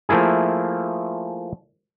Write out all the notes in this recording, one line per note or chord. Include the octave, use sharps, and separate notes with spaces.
F3 A3 A#3 E4 G#4